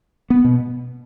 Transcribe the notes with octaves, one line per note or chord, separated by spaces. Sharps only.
B3
B2